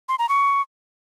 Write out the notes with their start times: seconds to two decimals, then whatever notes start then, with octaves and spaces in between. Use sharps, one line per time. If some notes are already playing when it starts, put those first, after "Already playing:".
0.09 C6
0.19 A#5
0.29 C#6